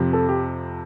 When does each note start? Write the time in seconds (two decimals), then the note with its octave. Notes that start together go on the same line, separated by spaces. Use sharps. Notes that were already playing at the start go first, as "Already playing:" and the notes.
Already playing: F2 C3 F3
0.13 A4
0.29 G4